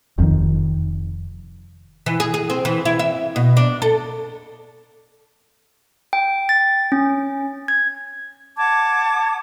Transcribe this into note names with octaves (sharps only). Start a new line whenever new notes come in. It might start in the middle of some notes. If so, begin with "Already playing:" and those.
F1 F2 A#2 D#3
E3
G#4
G#4
C4
E3
E4
E5
B2
D4
A4
G5
A6
C#4
G#6
F#5 A5 D6 G#6